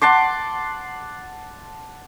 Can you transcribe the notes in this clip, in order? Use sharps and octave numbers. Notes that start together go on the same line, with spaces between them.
F#5 A5 C6 D6